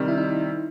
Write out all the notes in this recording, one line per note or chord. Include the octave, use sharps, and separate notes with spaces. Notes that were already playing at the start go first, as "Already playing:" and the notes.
Already playing: C3 D#3 G3
E4
D#4